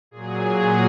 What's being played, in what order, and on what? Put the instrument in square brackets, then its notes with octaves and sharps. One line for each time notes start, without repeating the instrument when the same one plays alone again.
[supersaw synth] A#2 F#3 G#4